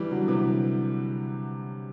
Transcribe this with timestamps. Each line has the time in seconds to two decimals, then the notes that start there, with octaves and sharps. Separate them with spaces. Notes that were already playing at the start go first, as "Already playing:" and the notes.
Already playing: E3 G3
0.11 D3 F#3
0.28 C3 E3